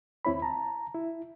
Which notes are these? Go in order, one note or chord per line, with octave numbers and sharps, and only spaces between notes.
D#2 C4 E4 C#5 B5
A5 A#5
E4